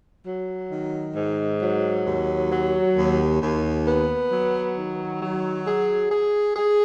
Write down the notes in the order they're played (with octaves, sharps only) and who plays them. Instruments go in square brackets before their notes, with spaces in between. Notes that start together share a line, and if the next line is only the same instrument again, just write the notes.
[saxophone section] F#3
D#3
G#2
F#3
D#2
F#3
D#2
D#2
B3
F#3
D#3
F#3
G#4
G#4
G#4